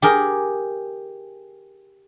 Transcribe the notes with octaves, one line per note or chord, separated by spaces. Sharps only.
G4 G#4 A#4